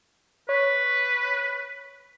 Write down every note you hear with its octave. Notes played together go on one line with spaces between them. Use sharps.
B4 C#5